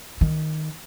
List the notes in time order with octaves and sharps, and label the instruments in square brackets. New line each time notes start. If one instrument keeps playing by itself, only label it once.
[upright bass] D#3